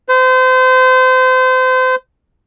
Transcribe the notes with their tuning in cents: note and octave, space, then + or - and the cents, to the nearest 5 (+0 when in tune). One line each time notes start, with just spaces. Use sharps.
C5 -30